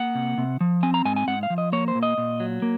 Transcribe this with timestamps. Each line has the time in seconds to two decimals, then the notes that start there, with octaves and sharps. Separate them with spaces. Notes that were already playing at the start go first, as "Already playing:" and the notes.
Already playing: A#3 F#5
0.15 C3
0.38 C3
0.61 F3
0.83 C4 G#5
0.94 A#5
1.05 G#2 G#5
1.16 G#5
1.27 G#2 F#5
1.43 F5
1.50 F3
1.58 D#5
1.73 A#3 C#5
1.88 C5
1.95 A#2
2.03 D#5
2.18 A#2
2.40 F#3
2.62 A#3